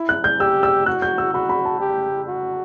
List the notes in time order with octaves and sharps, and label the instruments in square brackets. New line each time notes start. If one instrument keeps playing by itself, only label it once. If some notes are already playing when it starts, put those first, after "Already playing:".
Already playing: [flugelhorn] E4
[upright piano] F#6
G6
[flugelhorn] G4 [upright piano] E6
[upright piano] E6
[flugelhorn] F#4 [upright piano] F#6
[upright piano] G6
E6
[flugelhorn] F#4 [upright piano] B5
[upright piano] B5
A5
[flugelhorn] G4
F#4